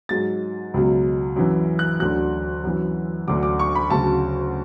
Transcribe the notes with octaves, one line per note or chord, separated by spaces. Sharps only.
G#2 F#3 A6
C#2 B2 F#3
F#2 E3
F#6
D2 D3 F#3 F#6
F#2 E3
D2 D3 F#3 D6
D6
C#6
B5
D2 C#3 F#3 A5